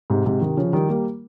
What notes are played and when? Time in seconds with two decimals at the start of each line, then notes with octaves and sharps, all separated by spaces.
0.10 G#2 C3
0.26 G#2 C3
0.41 C3 D#3
0.57 C#3 F3
0.73 D#3 G3
0.89 G3 A#3